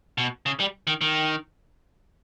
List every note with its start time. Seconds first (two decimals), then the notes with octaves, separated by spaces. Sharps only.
0.18 B2
0.46 C#3
0.60 G3
0.87 D#3
1.01 D#3